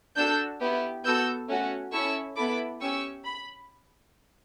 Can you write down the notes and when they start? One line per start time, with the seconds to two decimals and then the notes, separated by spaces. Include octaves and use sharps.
0.17 D4 F#4 A4 E6 G6
0.61 B3 E4 G4
1.05 B3 F#4 A4 E6 G6
1.48 A3 C#4 F#4
1.93 C#4 E4 A4 C#6 E6
2.36 B3 E4 A4 B5 D6
2.81 C#4 G4 C#6 E6
3.24 B5